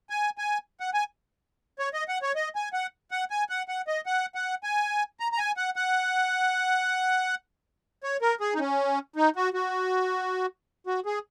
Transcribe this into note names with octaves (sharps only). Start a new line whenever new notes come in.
G#5
G#5
F#5
G#5
C#5
D#5
F#5
C#5
D#5
G#5
F#5
F#5
G#5
F#5
F#5
D#5
F#5
F#5
G#5
A#5
A#5
G#5
F#5
F#5
C#5
A#4
G#4
D#4
C#4
D#4
F#4
F#4
F#4
G#4